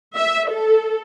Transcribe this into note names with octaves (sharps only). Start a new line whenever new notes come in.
E5
A4